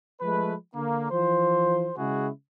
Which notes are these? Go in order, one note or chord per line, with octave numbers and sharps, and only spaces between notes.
F3 G#3 A3 B4
D3 A#3
E3 F3 C5
C#3 G#3 E4 F#4 G#4